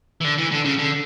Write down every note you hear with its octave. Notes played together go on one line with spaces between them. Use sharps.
E3
D3
E3
D3
C#3
D3